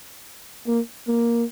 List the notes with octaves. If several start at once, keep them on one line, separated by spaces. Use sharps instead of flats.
A#3
A#3